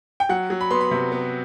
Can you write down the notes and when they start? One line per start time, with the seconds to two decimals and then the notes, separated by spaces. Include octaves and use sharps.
0.20 G5
0.29 F#3 F#5
0.50 F#3
0.61 B5
0.70 B3 C6
0.81 B5
0.91 C3
1.12 B3